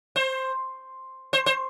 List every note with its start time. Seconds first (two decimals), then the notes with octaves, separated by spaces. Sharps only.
0.16 C5
1.33 C5
1.46 C5